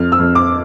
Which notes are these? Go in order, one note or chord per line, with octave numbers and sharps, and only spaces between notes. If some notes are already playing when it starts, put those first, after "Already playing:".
Already playing: F2 F6
E6
F2
D6